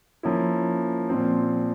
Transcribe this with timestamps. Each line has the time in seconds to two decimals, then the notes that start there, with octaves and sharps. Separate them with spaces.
0.23 F3 A#3 C#4 E4
1.09 A#2 F3 C4